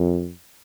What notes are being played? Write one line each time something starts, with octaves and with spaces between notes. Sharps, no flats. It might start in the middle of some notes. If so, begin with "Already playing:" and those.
Already playing: F2